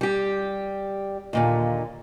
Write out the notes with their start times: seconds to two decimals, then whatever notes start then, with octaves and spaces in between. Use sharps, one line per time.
0.01 G3 G4
1.33 D#2 A#2 D3